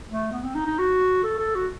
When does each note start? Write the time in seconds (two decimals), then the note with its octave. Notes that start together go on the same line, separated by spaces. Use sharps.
0.09 A3
0.32 B3
0.44 C4
0.55 D#4
0.66 D#4
0.78 F#4
1.23 A4
1.39 A4
1.55 F#4